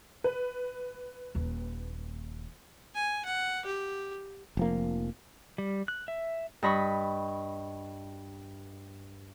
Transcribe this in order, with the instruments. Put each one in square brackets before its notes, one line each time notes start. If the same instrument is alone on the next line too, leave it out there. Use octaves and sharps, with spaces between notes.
[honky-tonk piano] B4
[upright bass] D#1 D#2
[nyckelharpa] G#5
F#5
G4
[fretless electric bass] F1 F3 A#3
[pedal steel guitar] G3
F#6
E5
[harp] G2 D#5 B5 C#6